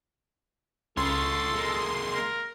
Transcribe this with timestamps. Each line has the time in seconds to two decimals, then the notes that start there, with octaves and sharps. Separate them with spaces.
0.97 C#2 F4 A4 C#5 C6
1.55 G#3 A#3
2.15 A#4